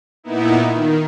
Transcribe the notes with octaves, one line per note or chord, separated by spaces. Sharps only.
A#2 B3 D#4 E4
D#3